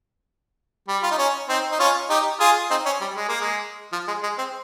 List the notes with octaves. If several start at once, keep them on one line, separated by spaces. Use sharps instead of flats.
G3
F4
D#4
C#4
C4 D#4
D#4
C#4 F4
D#4 G4
F4 G#4
C4 D#4
C#4
G3
G#3
A#3
G#3
F3
G#3
G#3
C4